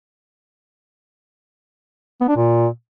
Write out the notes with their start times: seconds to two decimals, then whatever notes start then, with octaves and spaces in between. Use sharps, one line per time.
2.21 B3
2.28 D4
2.36 A#2